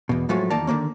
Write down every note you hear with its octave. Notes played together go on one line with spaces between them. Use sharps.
E2 B2
A2 F3 F#3 G#3 A3
E2 D#3 A#3 D5 A5 A#5
D3 D#3 A#3 C#4